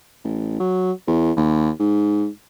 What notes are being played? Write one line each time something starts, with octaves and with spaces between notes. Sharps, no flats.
A1
F#3
E2
D#2
G#2